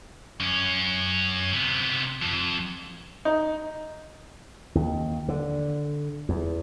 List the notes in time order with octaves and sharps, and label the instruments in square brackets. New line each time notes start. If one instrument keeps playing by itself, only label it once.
[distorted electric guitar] F#2 C#4
C3 B3
F2
[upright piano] D#4
[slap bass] D#2
D3
E2